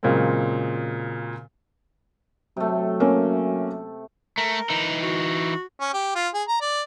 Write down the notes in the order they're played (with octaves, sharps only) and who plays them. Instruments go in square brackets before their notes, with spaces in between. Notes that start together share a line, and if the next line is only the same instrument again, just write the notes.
[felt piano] A#2 C#3 F#3 G#3 C4
[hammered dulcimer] C3 A3 [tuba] F#3
[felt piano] A#3 C#4
[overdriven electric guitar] A3 [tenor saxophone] A#4
[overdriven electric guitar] E3 D#4
[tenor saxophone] F#4
[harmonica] C#4
G4
F4
G#4
A#5
D5